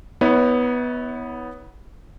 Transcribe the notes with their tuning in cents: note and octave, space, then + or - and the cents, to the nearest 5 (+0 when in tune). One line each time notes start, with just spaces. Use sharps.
B3 +0 E4 -45 C#5 +10